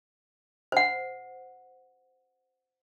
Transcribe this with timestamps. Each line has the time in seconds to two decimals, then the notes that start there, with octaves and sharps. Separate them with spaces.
0.72 C5 F#5